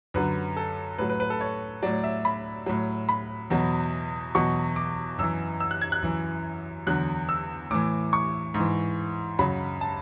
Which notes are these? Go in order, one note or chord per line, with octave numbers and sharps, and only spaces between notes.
F#2 D3 F#3 B4
A4
A2 F#3 B4
B4
B4
A4
C#5
A2 F#3 D5
E5
B5
A2 F#3
B5
E2 B2 F#3
E2 B2 F#3 C#6
D6
F#2 E3 E6
E6
F#6
G#6
F#6
F#2 E3
E2 D3 F#3 F#6
E6
A2 E3 D6
C#6
G#2
E3
F#2 C#3 F#3 B5
A5